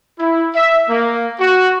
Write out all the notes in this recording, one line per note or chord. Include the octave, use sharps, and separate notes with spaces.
E4
E5
A#3
F#4